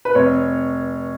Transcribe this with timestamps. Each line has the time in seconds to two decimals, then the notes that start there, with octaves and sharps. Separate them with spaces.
0.05 B4
0.15 F1 C#5